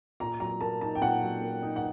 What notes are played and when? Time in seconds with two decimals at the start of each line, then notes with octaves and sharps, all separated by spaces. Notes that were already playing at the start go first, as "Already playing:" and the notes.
0.20 A#2 A#5
0.40 F#3 A#5
0.61 A#3 A5
0.81 D#4 A5
0.95 G5
1.01 A#2 F#5
1.22 F#3
1.41 A#3
1.62 D#4
1.76 F#5